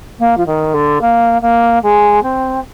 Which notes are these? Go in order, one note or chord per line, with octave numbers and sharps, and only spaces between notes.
A#3
F3
D#3
D3
A#3
A#3
G#3
C4